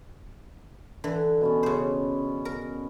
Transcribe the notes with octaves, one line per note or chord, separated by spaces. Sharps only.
D3 E3
B2 B3 C#4
C#3 C5
A#4